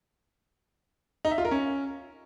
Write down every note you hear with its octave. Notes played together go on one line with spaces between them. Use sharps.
D#4
E5
F4
A#4
C#4